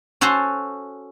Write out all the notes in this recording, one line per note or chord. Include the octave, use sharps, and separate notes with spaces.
C#4 F#4 A4 C5 A5 C6